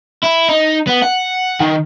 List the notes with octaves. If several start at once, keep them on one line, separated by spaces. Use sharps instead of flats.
E4
D#4
B3
F#5
D#3